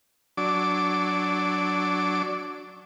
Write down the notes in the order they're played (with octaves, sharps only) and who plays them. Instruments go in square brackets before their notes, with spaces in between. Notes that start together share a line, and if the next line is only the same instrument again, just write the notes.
[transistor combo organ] F#3 D4 D6